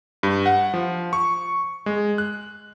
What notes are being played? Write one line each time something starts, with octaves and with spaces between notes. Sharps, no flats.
G2
F#5
F3
C#6
G#3
F#6